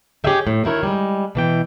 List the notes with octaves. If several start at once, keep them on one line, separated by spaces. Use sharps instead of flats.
G4 G#4 C#5 D#5 E5 G5
A2
D2 D#3 E4 A#4 C#5
G3 G#3
B2 E3 G5